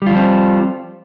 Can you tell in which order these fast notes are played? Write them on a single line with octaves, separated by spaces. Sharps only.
G3 F4 F3 C4